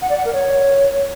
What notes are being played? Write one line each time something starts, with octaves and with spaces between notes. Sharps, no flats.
F#5
D5
F#5
A#4
C#5